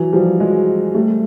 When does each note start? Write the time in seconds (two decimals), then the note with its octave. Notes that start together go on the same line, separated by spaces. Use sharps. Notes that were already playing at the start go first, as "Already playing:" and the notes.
Already playing: E3 F#3
0.13 F3 G3
0.40 F#3 G#3
0.94 G3 A3